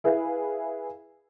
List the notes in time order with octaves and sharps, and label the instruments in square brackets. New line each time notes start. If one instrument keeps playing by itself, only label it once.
[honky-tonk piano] E4 G#4 B4 E5 F5